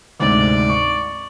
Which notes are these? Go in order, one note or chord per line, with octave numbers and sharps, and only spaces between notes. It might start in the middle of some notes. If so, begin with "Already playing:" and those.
D2 G#2 C3 D5
C#6